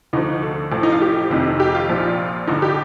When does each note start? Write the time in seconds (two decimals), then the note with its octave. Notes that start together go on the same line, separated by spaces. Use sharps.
0.13 D2 D3 F3 D#4
0.43 A4
0.72 A1 A2 F3
0.83 D#4
0.92 F4
1.02 G4
1.30 F1 F2 C3 D#3
1.60 G4
1.75 F4
1.89 A#1 A#2 F3
2.47 A1 G2 D3 D#4
2.62 G4